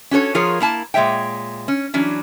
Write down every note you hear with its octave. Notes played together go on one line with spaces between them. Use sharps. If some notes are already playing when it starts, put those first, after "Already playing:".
C#4 F#4 A4 C#5
F3 F4 G#4 A#4 C#5
A#3 E4 A5
A#2 G#3 C#5 E5 G5
C#4
E3 F#3 C#4 D4